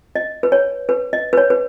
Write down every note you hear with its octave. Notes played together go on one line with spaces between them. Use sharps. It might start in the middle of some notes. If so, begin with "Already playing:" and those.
D#5
B4
C#5
B4
D#5
B4
C#5
B4